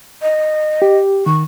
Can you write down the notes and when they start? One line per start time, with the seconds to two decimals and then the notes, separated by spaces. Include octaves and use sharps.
0.22 D#5
0.82 G4
1.26 D#3 C#6